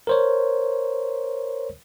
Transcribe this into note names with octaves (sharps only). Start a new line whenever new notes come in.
A#4 C5 C#5